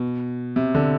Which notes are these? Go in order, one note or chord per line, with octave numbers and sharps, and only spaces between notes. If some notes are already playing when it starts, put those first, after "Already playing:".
Already playing: B2
C3
D3